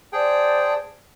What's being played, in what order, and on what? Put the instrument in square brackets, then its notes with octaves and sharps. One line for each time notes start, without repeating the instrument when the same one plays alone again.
[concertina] G#4 G5 [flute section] C5 D5 A5